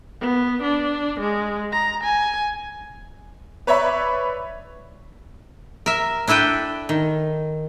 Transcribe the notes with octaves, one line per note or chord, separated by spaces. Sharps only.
B3
D4
G#3
A#5
G#5
B4 C#5 D5 E5 B5
A#4 E5
D4 E4 A4 B4 G5
D#3